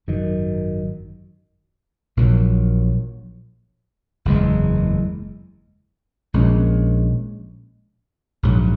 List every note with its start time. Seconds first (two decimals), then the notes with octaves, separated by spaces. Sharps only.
0.08 G#1 F#2 D#3
2.17 A#1 A#2 F#3
4.25 F#1 E2 B2 G#3
6.34 A#1 A#2 G#3 C#4
8.43 A#1 G#2 F#3